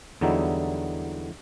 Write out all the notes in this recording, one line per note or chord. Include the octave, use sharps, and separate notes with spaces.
E2 D3 F#3 G3 D#4 E4